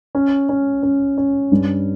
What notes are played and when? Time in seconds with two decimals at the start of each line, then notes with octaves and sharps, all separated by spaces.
0.15 C#4
0.49 C#4
0.83 C#4
1.18 C#4
1.52 G2